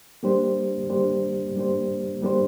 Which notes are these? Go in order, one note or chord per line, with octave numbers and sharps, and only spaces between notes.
G3 A#3 D4 G4 C5
G3 A#3 D4 G4 C5
G3 A#3 D4 G4 C5
G3 A#3 D4 G4 C5